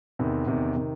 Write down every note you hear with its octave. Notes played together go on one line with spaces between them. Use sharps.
E2 C3 D#3
E2 C3 D#3
C3 D#3